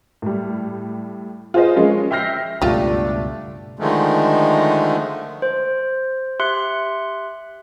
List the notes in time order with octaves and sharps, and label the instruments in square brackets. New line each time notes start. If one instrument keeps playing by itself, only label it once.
[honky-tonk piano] A2 G3
F4 G#4 B4 C5 D#5
F3 G#3 C#4
E5 G5 F6 G6 A#6 C7
[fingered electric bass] C#2 G2 B2 [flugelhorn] A3 [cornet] D4 [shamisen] F4 G4
[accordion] D3 D#3 F3 G#3 A3
[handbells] C5
G4 E5 C6 F#6 C#7